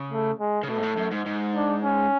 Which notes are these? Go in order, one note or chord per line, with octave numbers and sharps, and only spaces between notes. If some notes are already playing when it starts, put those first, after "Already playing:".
Already playing: C#3
A3
G#3
C#3
B2 A3
G#2
A2
F#2
G#2
G#2
D4
C#4